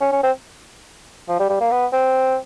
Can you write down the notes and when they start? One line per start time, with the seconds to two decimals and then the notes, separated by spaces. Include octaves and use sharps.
0.01 C#4
0.12 C#4
0.23 C4
1.29 F3
1.39 G3
1.49 G3
1.61 A#3
1.71 B3
1.93 C4